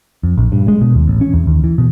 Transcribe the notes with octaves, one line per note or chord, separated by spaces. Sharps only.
F2
A#1
G2
G#3
B2
D#2
A1
C#4
E2
D#2
E3
B2